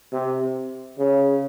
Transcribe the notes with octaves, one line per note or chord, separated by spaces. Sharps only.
C3
C#3